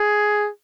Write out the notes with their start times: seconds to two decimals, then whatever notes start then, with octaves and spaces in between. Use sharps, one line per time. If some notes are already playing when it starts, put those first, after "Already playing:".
Already playing: G#4